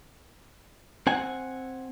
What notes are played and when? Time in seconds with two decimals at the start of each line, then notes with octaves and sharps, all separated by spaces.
1.07 C4 F#5 G#5